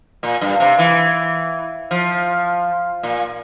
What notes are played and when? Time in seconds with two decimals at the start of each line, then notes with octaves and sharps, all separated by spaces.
0.23 A#2
0.41 G2
0.60 C3
0.79 E3
1.91 F3
3.03 A#2